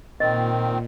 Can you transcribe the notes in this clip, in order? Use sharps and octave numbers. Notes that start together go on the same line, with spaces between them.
A#2 D#3 C4 D#5